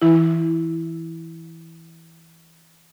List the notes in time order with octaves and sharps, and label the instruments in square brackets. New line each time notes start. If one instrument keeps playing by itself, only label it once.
[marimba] E3 E4